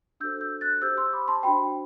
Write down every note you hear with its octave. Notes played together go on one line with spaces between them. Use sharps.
D4 F#4 A4 C5 E6 G6
E6 G6
F#6 A6
G4 C5 E6 G6
C6 E6
B5 D6
A5 C6
D4 F#4 C5 G5 B5